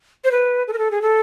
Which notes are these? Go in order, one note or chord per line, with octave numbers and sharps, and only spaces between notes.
C5
B4
A4
A#4
A4
G#4
A4